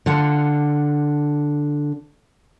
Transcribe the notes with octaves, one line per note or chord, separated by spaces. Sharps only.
D3 F4 F#5